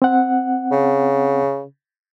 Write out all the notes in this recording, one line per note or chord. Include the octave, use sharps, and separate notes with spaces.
C4 F#5
C#3